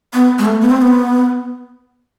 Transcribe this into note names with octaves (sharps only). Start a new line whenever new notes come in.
B3
G#3
A3
B3
C4
B3